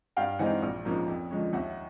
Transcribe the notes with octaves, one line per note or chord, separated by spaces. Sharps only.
G2 F5 G5
E3 G#3 C4 D#4 F#5 G#5
A#1
G#2 F3 A#3 C#4
F2
D3 F3 G#3 C#4
D#2 E5 F#5